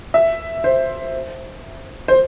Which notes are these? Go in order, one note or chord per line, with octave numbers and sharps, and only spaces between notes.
E5
C5
C5